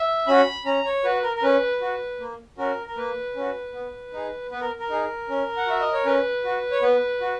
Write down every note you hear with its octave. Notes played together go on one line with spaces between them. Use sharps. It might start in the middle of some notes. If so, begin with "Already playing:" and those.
Already playing: E5
C#4 F#4 B5
C#4 A#5
C#5
F#4 B4
A#4
A#4
C#4 B4
F#4
A#3
C#4 F#4 A#4
A#4
A#3 B4
C#4 F#4
B3
D#4 G#4
B3 B4
A#4
A#4
D#4 G#4
C#4
F#5
F#4 E5
D#5
C#5
C#4 B4
F#4
C#5
B3 B4
F#4